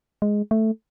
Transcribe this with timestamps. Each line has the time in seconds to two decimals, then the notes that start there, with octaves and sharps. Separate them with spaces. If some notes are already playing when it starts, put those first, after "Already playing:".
0.22 G#3
0.51 A3